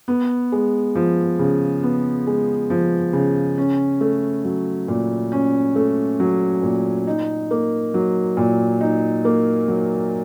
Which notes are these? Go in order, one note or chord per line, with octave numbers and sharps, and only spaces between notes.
B3
G#3
F3
C#3
B3
G#3
F3
C#3
C#4
A3
F#3
A#2
C#4
A3
F#3
A#2
D#4
A#3
F#3
A#2
D#4
A#3
F#3